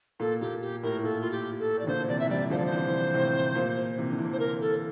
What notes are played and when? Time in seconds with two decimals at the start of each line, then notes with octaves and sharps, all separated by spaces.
0.20 A#2 A4
0.41 A#2 G4
0.61 G4
0.83 A2 A#4
1.03 A#2 A4
1.21 F4
1.31 G4
1.60 A4
1.79 E3 D5
1.87 A#2 D3 C5
2.08 C3 E3 D5
2.19 E5
2.30 E3 G3 D5
2.50 D3 F3 C5
2.58 D5
2.66 C5
2.72 C3 E3
3.14 A2 C3
3.55 A#2
3.97 C3 E3
4.11 D3
4.18 C3 E3
4.33 C5
4.39 A#4
4.61 A4